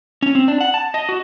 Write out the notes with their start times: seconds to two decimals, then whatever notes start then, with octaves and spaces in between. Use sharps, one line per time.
0.22 C#4
0.35 C4
0.48 D4
0.61 F#5
0.74 A5
0.94 D#5
1.09 F#4